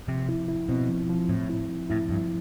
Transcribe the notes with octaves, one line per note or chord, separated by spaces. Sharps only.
C3 F3
E4
E4
B2 C4
F3
F3
A2 C4
E4
F3
A2 E4
G2 F3